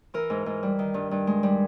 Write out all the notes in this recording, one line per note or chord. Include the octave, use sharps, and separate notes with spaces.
E3 A#4
G#2
G#2
G3
D#3
G2
G2
G#3
G3